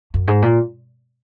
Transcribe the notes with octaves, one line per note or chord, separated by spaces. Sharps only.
F#2
G#2
A#2